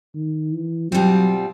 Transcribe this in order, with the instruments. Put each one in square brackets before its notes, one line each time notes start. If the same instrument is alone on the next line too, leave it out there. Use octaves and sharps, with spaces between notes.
[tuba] D#3
E3
[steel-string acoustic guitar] B2 G3 C4 F4 [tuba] F#3